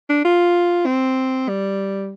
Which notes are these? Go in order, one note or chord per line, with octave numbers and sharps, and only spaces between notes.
D4
F4
C4
G3